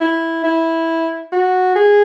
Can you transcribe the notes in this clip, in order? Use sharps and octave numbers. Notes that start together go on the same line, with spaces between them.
E4
E4
F#4
G#4